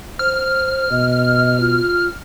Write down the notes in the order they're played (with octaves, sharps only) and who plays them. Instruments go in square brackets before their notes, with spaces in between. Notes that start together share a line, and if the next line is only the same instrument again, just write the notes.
[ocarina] C5 [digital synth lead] F6
[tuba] B2 [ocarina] D#5
[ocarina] F4